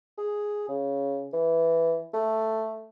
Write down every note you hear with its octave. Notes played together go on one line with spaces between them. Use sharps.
G#4
C#3
E3
A3